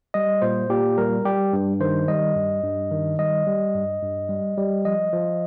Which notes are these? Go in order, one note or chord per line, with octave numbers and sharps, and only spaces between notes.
G3 D#5
A#2 C5
A#2 G4
G3 A#4
G3 G4
G2
D#3 C5
G3 D#5
G2
G2
D#3
G3 D#5
G3
G2
G2
G3
G3
F3 D#5
F3